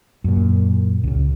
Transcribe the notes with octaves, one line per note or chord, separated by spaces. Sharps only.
F#2 A#2
C#2 C#3